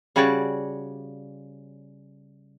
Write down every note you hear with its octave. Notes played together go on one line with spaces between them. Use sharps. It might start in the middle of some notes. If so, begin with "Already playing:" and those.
C#3 G3 F#4 C#5 D5